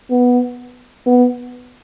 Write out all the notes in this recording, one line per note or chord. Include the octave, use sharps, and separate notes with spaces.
B3
B3